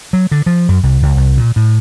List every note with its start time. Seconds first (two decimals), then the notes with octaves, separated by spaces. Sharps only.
0.13 F#3
0.32 D3
0.46 F3
0.69 F#2
0.83 C2
1.02 C#2
1.17 C2
1.37 A#2
1.56 A2